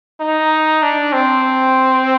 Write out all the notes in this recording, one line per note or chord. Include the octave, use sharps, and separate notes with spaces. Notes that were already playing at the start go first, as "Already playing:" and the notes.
D#4
D4
C4